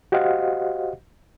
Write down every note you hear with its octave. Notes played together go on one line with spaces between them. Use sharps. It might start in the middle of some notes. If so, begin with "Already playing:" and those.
F#4 G4 C5 D#5 F5 F#5